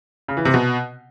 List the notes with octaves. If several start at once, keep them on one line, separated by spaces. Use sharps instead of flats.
C#3
E3
C3
B2